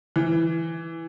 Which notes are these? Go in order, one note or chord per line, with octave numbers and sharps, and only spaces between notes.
E3